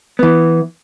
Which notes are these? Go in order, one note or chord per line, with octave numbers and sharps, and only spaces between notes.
E3 B3